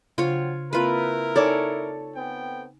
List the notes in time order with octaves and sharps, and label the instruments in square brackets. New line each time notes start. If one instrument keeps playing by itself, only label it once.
[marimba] C#3 D4 C5 [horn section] F3 F#3 C4 [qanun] F4 C#5
[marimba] A#3 C4 [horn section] E4 A#4 [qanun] F4 B4
[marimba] D#4 G#5 [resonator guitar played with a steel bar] A4 C#5 D5
[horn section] B3 C4 G5 [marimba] G#5